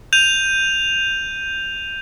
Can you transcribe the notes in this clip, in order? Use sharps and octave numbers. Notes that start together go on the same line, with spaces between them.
G6 D#7 F7